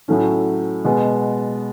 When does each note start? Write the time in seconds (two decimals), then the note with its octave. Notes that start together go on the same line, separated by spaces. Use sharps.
0.08 A2 F#3 A3 C#4
0.84 B2 G#3 B3